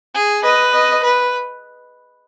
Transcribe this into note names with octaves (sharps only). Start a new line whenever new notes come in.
G#4
B4 D#5
D#5
B4